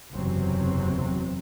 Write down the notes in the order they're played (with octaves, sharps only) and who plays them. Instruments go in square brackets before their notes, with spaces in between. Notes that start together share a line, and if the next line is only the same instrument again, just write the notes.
[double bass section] F#1 E2 C3 F#3 C4